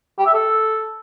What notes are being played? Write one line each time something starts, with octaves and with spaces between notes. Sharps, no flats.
G4
E5
A4